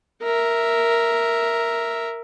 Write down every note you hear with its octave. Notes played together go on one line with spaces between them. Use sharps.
A#4 E5